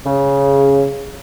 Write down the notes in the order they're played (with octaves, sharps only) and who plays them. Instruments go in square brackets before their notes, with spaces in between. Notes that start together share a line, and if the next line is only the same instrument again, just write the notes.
[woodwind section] C#3